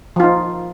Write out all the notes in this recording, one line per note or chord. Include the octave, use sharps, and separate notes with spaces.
F3 D#4 F4